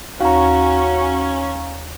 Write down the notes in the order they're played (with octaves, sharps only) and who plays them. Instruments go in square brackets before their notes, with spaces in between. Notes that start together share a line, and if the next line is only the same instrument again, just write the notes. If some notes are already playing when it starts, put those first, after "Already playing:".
[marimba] D#2 [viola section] C#4 [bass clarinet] F#4 [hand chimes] F5 A#5